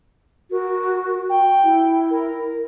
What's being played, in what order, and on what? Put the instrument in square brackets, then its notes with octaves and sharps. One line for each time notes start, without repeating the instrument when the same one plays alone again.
[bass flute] F#4 [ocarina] A#4
[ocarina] G5
[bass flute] E4
[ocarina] A#4